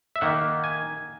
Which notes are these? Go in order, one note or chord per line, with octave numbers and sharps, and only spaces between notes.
E5
D#3 A#3 F#5
G#5